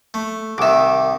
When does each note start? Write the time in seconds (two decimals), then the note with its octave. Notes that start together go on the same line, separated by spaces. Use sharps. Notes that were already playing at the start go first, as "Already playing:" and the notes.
0.14 A3
0.58 C2 D#3 E5 D6